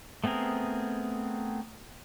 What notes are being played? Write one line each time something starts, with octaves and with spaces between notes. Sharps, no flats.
A3 B3 C4 G#4 A#4